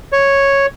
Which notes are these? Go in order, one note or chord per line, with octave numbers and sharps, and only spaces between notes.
C#5